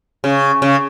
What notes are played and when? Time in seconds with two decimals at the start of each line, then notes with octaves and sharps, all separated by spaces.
0.24 C#3
0.62 C#3